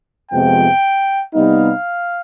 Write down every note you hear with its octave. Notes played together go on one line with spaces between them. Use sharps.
F2 C3 F3 G#3 B3 G5
C3 G3 B3 D#4 F5